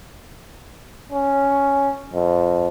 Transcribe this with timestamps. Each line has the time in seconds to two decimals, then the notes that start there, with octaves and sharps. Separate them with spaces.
1.12 C#4
2.13 F2